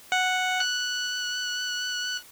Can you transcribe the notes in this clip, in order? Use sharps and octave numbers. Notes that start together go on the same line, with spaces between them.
F#5
F#6